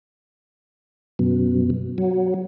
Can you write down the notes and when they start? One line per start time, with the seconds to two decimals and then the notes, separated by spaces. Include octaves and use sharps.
1.19 F#2 B2
1.98 F#3